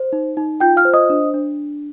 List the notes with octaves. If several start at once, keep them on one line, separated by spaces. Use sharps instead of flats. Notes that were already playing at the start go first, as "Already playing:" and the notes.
Already playing: C5
D#4
D#4
F4 G5 G6
F5 F6
C5
D#5 D#6
D4
D4